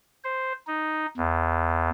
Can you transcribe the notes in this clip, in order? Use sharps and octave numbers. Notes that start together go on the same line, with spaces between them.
C5
D#4
E2